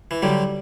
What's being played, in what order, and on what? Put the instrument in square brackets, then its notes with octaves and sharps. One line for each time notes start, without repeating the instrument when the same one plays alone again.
[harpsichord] E3
[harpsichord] D3 F#3 [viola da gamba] G3